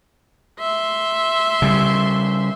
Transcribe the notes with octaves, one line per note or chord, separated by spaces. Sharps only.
E5 C6
C#3 G3